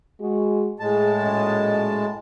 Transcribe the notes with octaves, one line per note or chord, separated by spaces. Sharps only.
G#3 F#4
A2 G#3 G#4 A5
F#2 A#2 D#5